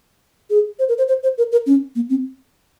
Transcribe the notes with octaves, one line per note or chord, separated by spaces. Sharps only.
G#4
C5
A#4
C5
C5
C5
A#4
A#4
C#4
A#3
C4